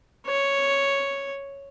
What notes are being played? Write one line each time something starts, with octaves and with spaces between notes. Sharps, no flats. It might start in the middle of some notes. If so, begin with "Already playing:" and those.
C#5